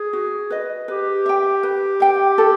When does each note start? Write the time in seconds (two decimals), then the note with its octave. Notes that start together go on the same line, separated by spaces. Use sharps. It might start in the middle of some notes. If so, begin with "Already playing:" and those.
Already playing: G#4
0.13 F#4
0.50 B4 D#5
0.88 G4 B4
1.26 E5 G5
1.63 B4
2.00 E5 G5
2.38 A4